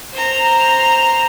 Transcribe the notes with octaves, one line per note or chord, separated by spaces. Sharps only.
C5 A#5